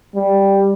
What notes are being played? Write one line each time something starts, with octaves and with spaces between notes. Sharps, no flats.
G3